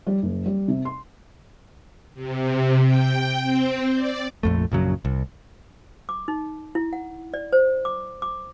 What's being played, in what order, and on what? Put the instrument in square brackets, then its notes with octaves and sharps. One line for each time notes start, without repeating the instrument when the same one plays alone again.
[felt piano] G3
F#1
G3
C3
C6
[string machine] C3
G5
C4
D5
[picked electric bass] A#1 F2 A3
A#1 F#2 C#3 F#3
C2
[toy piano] D6
D#4
E4
F#5
D5
C5
D6
D6